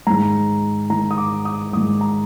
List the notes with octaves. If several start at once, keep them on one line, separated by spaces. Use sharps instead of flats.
G#2 D#3 G#3 A#5
G#2 D#3 G#3 A#5
D#6
D6
D#6
G#2 D#3 G#3 D#6
A#5